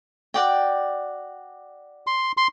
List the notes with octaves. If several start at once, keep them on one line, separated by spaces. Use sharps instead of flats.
F#4 D5 G5
C6
C6